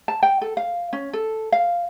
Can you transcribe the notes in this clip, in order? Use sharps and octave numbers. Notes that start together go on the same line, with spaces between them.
A5
G5
A4
F5
C#4
A4
F5